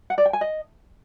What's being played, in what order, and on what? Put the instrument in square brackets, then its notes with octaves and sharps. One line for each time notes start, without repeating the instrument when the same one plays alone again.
[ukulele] F#5
D5
G5
G#5
D#5